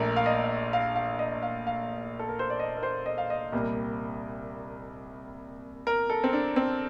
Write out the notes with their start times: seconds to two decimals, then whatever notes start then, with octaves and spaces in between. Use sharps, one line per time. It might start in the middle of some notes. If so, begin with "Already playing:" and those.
Already playing: A#1 A#2 A3 A#4
0.16 F5
0.26 D#5
0.73 F5
0.96 F5
1.19 D#5
1.43 F5
1.67 F5
2.19 A4
2.29 A#4
2.39 C5
2.50 D5
2.60 D#5
2.77 A#4
2.83 C5
3.06 D#5
3.18 F5
3.30 D#5
3.52 C2 A#2 G3 A#3
5.87 A#4
6.10 A4
6.24 C4
6.33 D4
6.56 C4